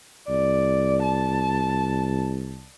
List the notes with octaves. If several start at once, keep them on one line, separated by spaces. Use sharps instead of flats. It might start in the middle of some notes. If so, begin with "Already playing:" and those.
C2 D5
A5